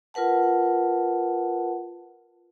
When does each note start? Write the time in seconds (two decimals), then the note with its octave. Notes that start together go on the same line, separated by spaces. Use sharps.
0.14 F4 A#4 B4 F#5 A5